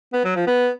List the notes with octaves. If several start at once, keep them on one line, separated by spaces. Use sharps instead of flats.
B3
F#3
F3
B3